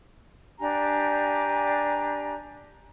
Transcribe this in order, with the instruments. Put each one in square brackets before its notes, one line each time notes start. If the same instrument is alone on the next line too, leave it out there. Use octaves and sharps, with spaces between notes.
[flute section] D4 G4 G#5 A#5